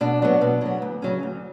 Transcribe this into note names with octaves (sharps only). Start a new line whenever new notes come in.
B2 D4
F#3 B3
B2
F#3 B3
D2
C#3 F#3 C#4
D2